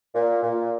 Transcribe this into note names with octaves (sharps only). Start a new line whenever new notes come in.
A#2
A#2